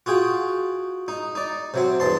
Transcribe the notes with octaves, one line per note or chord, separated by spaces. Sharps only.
F4 F#4 G#4 G5
D#4
D#4 D5
C3 F#3 C4
E2 G2 A5 C6